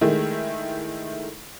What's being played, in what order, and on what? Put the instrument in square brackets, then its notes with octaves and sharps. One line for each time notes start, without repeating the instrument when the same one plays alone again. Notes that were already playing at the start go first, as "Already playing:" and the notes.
[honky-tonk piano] D#3 G#3 A3 E4